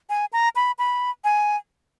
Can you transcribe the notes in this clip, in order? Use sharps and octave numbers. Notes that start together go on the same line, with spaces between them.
G#5
A#5
B5
B5
G#5